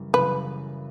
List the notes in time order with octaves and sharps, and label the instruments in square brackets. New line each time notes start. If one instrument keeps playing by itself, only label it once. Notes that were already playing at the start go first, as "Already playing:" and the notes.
Already playing: [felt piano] F#2 C#3 E3 G3
[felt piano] F#2 C#3 E3 G3 [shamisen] B4